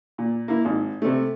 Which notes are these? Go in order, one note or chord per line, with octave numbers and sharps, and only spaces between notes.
A#2
A#3 E4
G#1
C3 A3